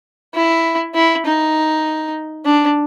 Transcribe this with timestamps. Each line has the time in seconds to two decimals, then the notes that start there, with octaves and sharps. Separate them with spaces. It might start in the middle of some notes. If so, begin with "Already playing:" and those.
0.35 E4
0.95 E4
1.25 D#4
2.45 D4